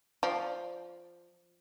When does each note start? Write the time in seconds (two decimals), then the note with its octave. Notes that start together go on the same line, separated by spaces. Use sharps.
0.23 F3 D5